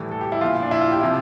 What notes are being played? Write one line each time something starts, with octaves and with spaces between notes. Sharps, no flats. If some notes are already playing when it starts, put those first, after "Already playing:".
Already playing: A2 E3 G3
A4
G4
E4
A#2 F3 F4
D4
E4
F4
G4
C3 F3 E4